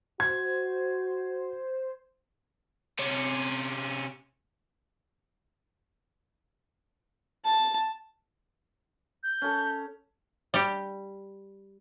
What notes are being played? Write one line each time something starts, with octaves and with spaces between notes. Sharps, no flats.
F#4 C5 G#6
C3 C#4
A5
G6
C#4 A4
G3 G4